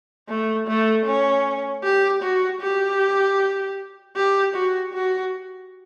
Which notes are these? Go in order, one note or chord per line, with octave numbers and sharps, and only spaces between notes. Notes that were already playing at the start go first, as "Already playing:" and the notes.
A3
A3
C#4
G4
F#4
G4
G4
F#4
F#4